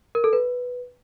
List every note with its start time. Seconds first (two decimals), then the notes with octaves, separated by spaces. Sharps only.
0.15 A#4
0.24 A4
0.33 B4